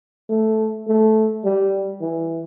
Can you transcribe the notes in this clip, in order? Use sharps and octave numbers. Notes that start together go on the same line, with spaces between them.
A3
A3
G3
E3